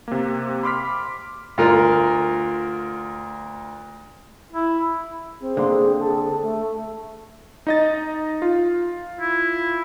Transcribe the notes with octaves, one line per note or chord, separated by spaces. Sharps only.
C3 A#3
B5 C6 D6 F6 B6
D2 F4 A#4
E4
C4 G#4
D3 A#3 C6
A4
A3
D#4 D#5 A6
F4
E4